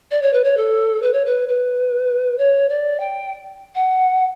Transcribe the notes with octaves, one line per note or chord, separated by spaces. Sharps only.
D5
C#5
B4
C#5
A4
B4
C#5
B4
B4
C#5
D5
G5
F#5